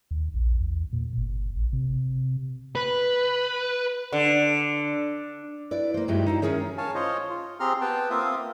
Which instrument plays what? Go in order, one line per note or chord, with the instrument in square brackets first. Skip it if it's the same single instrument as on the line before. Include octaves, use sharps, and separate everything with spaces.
[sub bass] D#2
A#1
E2
A#2
G1
A1
C3
[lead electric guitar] B4
[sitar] D3
[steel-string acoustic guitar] E4 B4 D5
A#3 C5
G2 F#3 G#3 D#4 E4 G4
D#4 E4 F5
D#3 C4 C#4 G#4 A#4 C#5
[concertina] C#5 F5 G#5 A5
F4 C5 C#5 D#5
F4
C4 G4 G#4 A#5 C6 F6
B3 B4 G5 A5
A#3 C4 F4 E5 F5 D#6